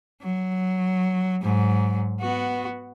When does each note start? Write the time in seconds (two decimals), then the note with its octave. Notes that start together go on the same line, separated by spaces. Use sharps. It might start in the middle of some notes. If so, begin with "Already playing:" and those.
0.23 F#3
1.42 G#2 F#3
2.21 B3 F#4